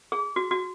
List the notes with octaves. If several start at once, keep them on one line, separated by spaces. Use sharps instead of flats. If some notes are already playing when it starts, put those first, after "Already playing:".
G#4
F#4
F#4